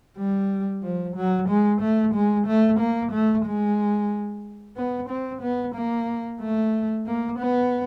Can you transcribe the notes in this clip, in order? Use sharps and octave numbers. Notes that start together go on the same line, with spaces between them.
G3
F3
F#3
G#3
A3
G#3
A3
A#3
A3
G#3
B3
C4
B3
A#3
A3
A#3
B3